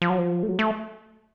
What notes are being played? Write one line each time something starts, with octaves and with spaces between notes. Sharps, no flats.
F3
F#3
F3
A3
F#3
A3